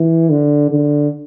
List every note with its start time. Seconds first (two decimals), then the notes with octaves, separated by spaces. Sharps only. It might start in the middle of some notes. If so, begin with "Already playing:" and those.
Already playing: E3
0.30 D3
0.71 D3